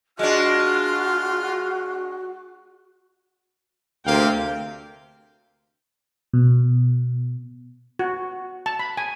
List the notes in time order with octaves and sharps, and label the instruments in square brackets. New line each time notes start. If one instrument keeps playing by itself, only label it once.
[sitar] G#3 D4 [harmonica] F4 F6 [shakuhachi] F#4
[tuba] D2 [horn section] C3 A#3 F5 [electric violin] G5
[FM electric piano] B2
[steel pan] F#4
A5
B5
G#5